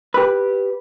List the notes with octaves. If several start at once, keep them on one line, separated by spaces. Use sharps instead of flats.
G4 B4